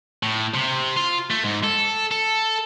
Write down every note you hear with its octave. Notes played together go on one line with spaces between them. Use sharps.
A2
C3
F4
A3
G#2
A4
A4